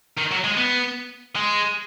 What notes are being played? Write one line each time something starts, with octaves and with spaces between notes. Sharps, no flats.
D#3
F#3
G#3
B3
G#3